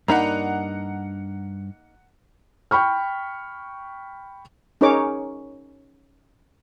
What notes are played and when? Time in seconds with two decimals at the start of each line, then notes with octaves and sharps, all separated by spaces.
0.08 G2 A#3 D4 D#4 F#5 A#5 B5
2.71 G5 B5 C#6 F6
4.81 C#4 D#4 G#4 A#4 C#5 D6